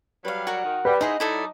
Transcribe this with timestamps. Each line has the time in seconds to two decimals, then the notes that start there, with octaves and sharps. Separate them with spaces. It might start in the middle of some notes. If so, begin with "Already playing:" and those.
0.25 F#3 G3 B4 F5
0.47 F#4 A#4 F#5
0.64 D#3
0.85 G3 B4
1.01 D#4 E4 G#4 C5 D#5 F#5
1.20 F#3 D#4 E4 A4 D5